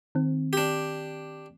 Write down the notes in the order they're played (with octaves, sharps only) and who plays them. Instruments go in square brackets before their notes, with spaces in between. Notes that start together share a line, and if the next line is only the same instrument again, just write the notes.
[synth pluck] D#3 C4
[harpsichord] D4 G4